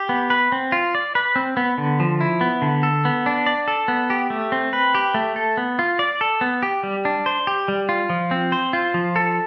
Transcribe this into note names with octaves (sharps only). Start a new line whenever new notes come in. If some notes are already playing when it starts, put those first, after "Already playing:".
Already playing: G4
B3
B4
C4
F4
D5
B4
C4
B3
D3
F3
E4
B3
D3
A4
B3
D4
D5
A4
B3
G4
A3
C4
B4
G4
A3
A4
B3
F4
D5
A4
B3
G4
G3
D4
C5
G4
G3
F4
F3
C4
C5
F4
F3
A4